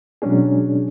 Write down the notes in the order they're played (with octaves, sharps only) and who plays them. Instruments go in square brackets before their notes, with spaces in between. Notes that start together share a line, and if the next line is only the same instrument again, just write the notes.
[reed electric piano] B2 F#3 G#3 C#4 D4 G#4